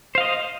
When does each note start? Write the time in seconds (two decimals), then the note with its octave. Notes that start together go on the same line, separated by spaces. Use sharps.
0.15 C5
0.18 F5
0.20 D#5